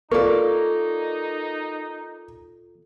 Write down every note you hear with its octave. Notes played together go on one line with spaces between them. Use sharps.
A#3 D#4 F4 A4 D5 C#6